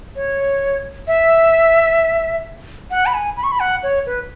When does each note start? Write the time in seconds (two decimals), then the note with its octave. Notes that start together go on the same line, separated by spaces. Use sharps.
0.16 C#5
1.07 E5
2.91 F#5
3.06 B5
3.14 G#5
3.37 B5
3.44 C#6
3.52 B5
3.60 F#5
3.83 C#5
4.06 B4